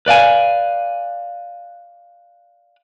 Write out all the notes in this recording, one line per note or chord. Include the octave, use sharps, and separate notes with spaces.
B4 D5 F5 G#5